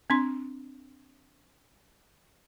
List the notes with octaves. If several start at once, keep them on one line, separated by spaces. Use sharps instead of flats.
C4 D4 C6